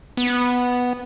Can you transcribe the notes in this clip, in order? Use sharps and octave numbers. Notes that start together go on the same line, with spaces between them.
B3